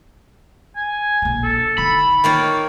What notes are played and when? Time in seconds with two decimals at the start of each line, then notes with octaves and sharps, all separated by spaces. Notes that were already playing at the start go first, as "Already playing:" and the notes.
0.76 G#5
1.22 A#1 D3
1.44 A4
1.78 D3 D#4 B5
2.24 D#3 A#3 F4 C#5